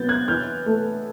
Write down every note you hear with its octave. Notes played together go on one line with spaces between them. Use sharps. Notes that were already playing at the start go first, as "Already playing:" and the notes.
Already playing: F#3 B3 G6 A6
F#6 G#6
E3 F6 G6
A3